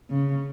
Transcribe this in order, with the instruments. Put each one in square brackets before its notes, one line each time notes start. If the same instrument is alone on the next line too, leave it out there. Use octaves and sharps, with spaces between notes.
[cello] C#3